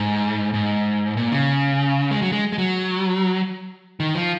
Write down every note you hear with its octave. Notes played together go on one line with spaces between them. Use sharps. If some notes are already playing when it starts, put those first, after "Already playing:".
Already playing: G#2
G#2
A#2
C#3
G#3
F#3
G#3
G#3
F#3
D#3
F3